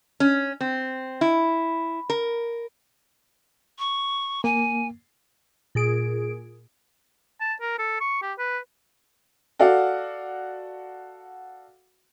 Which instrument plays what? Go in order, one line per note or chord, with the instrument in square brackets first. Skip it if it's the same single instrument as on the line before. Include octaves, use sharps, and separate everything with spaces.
[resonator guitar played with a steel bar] C#4
C4
E4
A#4
[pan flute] C#6
[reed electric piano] A#3 [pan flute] G#5
[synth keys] A#2 G#4 D7
[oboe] A5
A#4
A4
C#6
G4
B4
[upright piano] F#4 A4 D5 F5 F#5